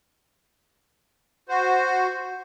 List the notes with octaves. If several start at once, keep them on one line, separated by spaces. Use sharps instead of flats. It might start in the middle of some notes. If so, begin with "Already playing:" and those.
F#4 C5